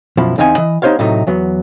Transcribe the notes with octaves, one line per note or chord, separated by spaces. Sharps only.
F#2 B2 F3 E4
E2 C4 D#4 F5 G#5
E3 D#5
B3 D#4 G4 C5 C#5 F5
A2 C3 F#3 A3 D#4
E2 F#3 B3